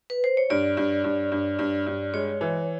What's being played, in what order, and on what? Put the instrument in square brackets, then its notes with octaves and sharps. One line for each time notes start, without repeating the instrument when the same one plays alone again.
[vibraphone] B4
C5
C#5
[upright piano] G2 [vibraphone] D5
[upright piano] G2
G2
G2
G2
G2
[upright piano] G#3 [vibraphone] C#5
[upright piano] E3